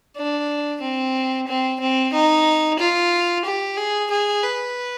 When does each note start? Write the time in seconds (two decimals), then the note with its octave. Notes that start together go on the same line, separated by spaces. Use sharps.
0.17 D4
0.81 C4
1.47 C4
1.80 C4
2.13 D#4
2.79 F4
3.45 G4
3.77 G#4
4.10 G#4
4.43 B4